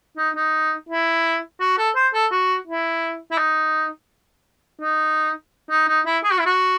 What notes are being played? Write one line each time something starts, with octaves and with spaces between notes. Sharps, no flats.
D#4
D#4
E4
F#4
A4
C5
A4
F#4
E4
E4
D#4
D#4
D#4
D#4
E4
G#4
F#4
E4
F#4